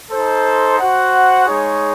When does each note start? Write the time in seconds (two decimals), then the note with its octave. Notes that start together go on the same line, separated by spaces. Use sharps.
0.11 D#4 A4 C5
0.79 F#4 C5 F#5
1.46 G#3 D#4 G#4 C#5